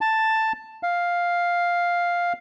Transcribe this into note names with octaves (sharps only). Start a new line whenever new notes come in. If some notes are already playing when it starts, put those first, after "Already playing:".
A5
F5